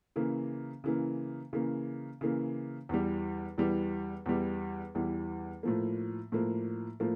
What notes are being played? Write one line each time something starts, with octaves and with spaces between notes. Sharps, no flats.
C#3 E3 A#3
C#3 E3 A#3
C#3 E3 A#3
C#3 E3 A#3
E2 E3 G3
E2 E3 G3
E2 E3 G3
E2 E3 G3
A2 F3 A#3
A2 F3 A#3
A2 F3 A#3